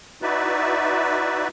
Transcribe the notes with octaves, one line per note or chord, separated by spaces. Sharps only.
D#4 E4 F#4 B4 D5 E5